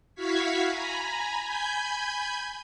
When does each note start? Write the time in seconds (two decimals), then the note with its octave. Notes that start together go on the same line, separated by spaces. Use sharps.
0.15 E4 F#4 F5 C#6 G#6 B6
0.66 G#5 A#5 B5
1.43 G#5 B5 G6 G#6